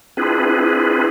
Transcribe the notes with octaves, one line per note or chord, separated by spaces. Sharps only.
C4 D4 E4 F4 G#4 B4